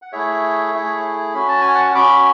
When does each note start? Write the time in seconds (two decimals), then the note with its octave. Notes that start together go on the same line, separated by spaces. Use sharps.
0.02 F#5
0.12 A3 E4 G#4 C#5 E5
0.73 A3 E4 G#4
1.34 C#4 F#4 B5
1.48 A5
1.61 G#5
1.75 F#5 A5
1.95 C#4 F#4 B5 D6